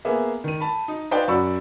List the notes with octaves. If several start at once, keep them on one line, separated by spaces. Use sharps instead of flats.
A#3 B3 G#4 E5
D#3 D#7
A5 B5
D#4
D#4 B4 C5 D5 F5 G5
F#2 F#4 D5 B5 C#6 E6